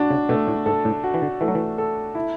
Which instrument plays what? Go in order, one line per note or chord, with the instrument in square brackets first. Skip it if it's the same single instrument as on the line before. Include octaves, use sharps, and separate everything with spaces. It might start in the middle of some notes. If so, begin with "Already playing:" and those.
Already playing: [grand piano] D4 F#4
[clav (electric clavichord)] C#3
[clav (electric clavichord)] B2 [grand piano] A3
[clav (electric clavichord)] A2
[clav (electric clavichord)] G#2 [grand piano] A4
[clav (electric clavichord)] A2
[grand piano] F#4
[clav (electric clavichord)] E3
D3
[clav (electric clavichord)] E3 [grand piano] A3
[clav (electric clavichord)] F#3
E3
[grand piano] A4
E4